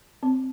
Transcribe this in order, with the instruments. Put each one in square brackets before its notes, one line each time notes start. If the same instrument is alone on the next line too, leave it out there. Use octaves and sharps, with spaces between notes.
[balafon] C4